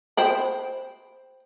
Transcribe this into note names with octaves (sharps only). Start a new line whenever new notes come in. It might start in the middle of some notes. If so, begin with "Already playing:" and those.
C5 G5 B5